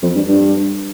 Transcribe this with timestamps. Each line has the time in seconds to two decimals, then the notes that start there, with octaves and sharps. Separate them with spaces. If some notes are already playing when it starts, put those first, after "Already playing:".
0.03 F2
0.15 G2
0.27 G2